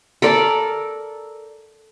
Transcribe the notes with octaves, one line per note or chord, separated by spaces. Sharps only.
A4 A#4 D5